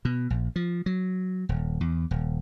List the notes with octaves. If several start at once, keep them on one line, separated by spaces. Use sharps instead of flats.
B2
A#1
F3
F#3
D#1
E2
D#1